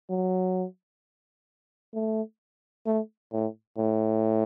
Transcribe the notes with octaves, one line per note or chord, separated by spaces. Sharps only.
F#3
A3
A3
A2
A2